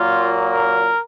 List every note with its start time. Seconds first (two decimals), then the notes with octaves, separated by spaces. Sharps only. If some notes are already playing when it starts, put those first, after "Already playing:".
Already playing: A#2 F#3 A#3 F4
0.51 A#4